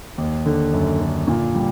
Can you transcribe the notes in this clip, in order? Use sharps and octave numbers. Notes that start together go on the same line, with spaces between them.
D#2
D3
F#2
D3
A#2
G3